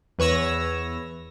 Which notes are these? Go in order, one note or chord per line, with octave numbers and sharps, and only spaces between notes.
E2 B4 C#5 E6 A#6